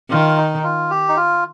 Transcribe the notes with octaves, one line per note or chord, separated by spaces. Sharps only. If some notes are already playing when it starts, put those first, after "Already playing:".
D#3 F4
D#4
F4
G4
D#4
F4